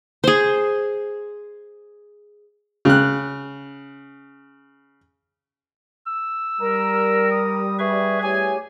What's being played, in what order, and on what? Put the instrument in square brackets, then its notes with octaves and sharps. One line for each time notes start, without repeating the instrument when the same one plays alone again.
[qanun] G#4 C5
[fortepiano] C#3 F#6
[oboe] E6
[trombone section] G3 [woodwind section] A#4
[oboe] D#6
[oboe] G#4 [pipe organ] B4 E5 C#6
[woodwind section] E2 A3 G#5 [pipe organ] G4 C#5